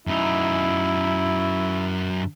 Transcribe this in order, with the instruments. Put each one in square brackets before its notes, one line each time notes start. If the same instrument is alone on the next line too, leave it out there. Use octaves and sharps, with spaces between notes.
[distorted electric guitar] F#2 D#4 [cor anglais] E4